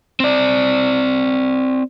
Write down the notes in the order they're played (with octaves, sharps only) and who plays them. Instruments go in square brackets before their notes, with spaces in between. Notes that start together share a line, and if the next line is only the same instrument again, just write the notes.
[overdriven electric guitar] C4 D5